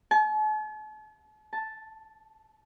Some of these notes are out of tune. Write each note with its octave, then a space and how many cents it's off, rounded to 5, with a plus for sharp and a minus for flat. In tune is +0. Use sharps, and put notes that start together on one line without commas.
A5 -45
A5 +0